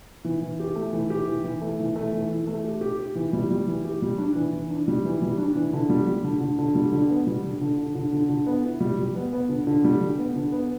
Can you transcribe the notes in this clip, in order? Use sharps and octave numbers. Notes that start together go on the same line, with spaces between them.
E3
E3
G4
A3
E3
G4
E3
E3
A3
E3
A3
E3
E3
A3
G4
G4
G4
E3
G3
G3
E3
G4
G3
D4
E3
E3
D4
G3
E3
G3
D4
E3
D3
G3
G3
D3
D3
D3
G3
D3
B3
G3
D3
D3
D3
D3
D3
D3
B3
E4
G3
G3
B3
B3
D3
D3
G3
D3
B3
D3
B3